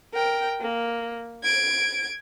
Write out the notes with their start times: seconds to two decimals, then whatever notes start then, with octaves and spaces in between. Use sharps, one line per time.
0.14 A#4 G5
0.60 A#3
1.43 G#6 D7